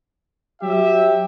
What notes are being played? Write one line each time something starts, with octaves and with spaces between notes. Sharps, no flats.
F#3 G4 E5